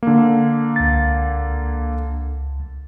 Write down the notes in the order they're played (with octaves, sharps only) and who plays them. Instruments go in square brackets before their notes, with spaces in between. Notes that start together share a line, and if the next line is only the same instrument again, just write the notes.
[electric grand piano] D3 A#3
[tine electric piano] C#2 A6